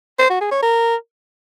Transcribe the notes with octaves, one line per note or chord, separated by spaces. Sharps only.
C5
F#4
G#4
C#5
A#4